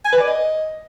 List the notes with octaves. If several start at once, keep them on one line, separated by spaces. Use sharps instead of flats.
G#5
B4
D5
D#5